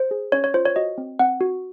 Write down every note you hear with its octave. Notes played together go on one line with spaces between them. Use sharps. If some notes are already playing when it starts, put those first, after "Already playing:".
Already playing: C5
G#4
C#4 C#5
C#5
F4 C5
C#5
F#4 D#5
C4
C4 F#5
F#4